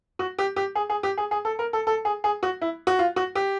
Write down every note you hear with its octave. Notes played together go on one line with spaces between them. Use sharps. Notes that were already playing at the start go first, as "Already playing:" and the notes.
F#4
G4
G4
G#4
G#4
G4
G#4
G#4
A4
A#4
A4
A4
G#4
G#4
F#4
E4
F#4
F4
F#4
G4